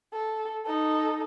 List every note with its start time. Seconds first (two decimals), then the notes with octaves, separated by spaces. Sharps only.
0.13 A4
0.66 D#4 A4